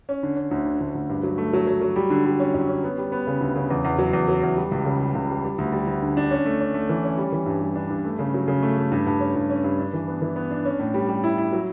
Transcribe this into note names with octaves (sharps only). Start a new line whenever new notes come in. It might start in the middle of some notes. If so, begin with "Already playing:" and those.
C#4
D3
C#4
D2
D3
D2
D2
G2
F#3
A3
F#3
F#3
F#3
G3
D3
G3
C#4
F#2
C#4
B3
G3
B3
C#3
D2
C#3
E2
E2
F#3
E2
F#3
E2
G3
C#2
C#3
G3
C#2
G3
G3
D2
G3
D2
D3
D4
C#4
A3
C#4
A3
E3
C#4
G3
E3
G2
G3
D4
G2
A3
C#3
F#3
C#3
A3
A3
G2
G2
C#4
G2
C#4
G2
D4
E3
B3
E3
B3
D4
C#4
A2
G3
G3
E4
E4
F#3